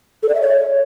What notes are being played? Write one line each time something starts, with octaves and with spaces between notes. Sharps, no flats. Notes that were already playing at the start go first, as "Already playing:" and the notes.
A4
D5
E5
C#5